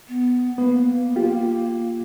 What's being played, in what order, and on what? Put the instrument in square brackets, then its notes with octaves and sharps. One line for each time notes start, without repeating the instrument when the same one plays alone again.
[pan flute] B3
[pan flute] A#3 [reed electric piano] B3
[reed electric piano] F4 G4